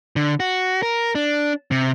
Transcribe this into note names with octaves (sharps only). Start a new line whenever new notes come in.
D3
F#4
A#4
D4
C3